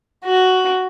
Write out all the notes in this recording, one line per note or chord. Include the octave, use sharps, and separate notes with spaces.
F#4